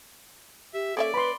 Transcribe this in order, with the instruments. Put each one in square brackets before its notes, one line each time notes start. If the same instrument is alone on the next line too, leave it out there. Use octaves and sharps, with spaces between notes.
[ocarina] G4 [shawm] E5
[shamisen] A#3 C#4 E5 [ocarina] A4 [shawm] D5
[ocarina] B4 [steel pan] B5 C6